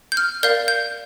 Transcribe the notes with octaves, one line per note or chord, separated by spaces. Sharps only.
G6
F6
A#4 D5 F5 G6
G6